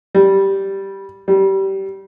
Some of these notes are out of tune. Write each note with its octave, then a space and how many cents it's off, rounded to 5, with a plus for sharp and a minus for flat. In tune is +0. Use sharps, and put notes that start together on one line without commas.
G3 -5
G3 -20